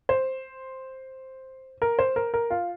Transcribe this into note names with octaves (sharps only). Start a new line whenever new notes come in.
C5
A#4
C5
A#4
A#4
F4